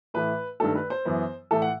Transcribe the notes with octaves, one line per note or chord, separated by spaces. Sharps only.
A2 E3 A3 B4
G2 D#3 A3 A4
B4
C5
F#2 E3 B3
A2 E3 A3 A4
F#5